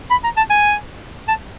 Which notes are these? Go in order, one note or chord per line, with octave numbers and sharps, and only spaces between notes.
B5
A#5
A5
G#5
A5